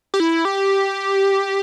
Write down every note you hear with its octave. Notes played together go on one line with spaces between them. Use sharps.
G4
E4
G4